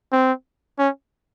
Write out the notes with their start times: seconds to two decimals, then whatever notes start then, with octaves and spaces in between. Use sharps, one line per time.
0.12 C4
0.79 C#4